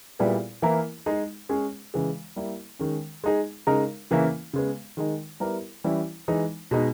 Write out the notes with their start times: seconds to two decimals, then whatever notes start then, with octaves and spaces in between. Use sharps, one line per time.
0.19 A#2 G3 B3 E4 G#4
0.62 E3 A#3 E4 A#4
1.06 G#3 D#4 G#4
1.49 G#3 C#4 G#4
1.94 C#3 E3 G#3
2.36 G3 A#3 E4
2.79 D#3 G#3 C#4
3.24 G#3 D#4 G#4
3.67 C#3 G#3 D#4 A#4
4.11 C#3 E3 A#3 C#4 E4
4.53 C#3 G#3 B3
4.97 D#3 G#3 D#4
5.40 G3 B3 E4 G4 A#4
5.84 E3 G3 C#4 E4
6.28 E3 G#3 D#4
6.71 B2 G#3 D#4